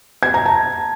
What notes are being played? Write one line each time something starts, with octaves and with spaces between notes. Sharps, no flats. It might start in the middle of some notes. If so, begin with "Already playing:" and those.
G#6
A#5
A5